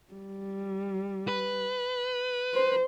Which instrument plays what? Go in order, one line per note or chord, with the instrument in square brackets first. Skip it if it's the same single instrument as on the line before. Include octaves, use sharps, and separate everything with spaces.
[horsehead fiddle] G3
[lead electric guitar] B4
[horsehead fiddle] C5